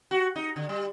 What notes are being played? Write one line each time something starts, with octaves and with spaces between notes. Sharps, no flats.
F#4
D#4
D3
G3